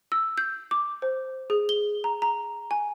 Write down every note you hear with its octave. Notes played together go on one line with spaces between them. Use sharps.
E6
G6
D6
C5
G#4
G7
A#5
A#5
G#5